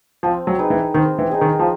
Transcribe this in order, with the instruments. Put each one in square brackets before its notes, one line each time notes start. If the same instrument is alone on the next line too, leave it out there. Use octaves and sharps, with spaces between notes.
[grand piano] F3 [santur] C4
[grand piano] F#3
[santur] D#4 G#4 B4
[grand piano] E3
[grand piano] D#3 [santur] C4
[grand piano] E3
[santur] D#4 G#4 B4
[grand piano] D#3
F3